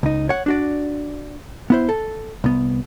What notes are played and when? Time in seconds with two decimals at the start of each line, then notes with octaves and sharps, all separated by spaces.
0.03 C#2 D#4
0.29 C#5 F#5
0.46 D4 F#4 D5
1.70 B3 E4 C5
1.89 A4
2.44 C2 B3